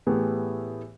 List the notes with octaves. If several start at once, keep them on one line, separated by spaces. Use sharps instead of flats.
A2 E3 A3 B3 G4 G#4